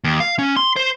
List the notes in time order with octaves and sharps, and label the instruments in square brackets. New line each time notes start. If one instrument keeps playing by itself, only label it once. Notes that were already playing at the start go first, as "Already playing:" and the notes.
[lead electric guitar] D#2
F5
C#4
C6
C5